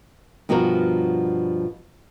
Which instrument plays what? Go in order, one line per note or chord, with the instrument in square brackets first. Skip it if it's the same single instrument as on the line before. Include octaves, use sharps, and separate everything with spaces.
[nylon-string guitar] G2 B2 F3 F#4 A#4